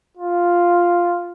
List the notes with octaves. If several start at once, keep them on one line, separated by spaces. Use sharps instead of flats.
F4